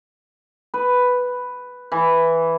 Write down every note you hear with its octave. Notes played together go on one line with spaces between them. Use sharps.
B4
E3